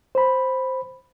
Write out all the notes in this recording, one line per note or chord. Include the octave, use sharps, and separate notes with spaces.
C5 B5